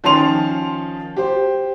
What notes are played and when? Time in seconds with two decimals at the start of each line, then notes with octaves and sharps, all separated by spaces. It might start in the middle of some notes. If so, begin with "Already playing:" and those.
0.04 D#3 F3 C#4 A5 C6 F7
1.17 G4 C5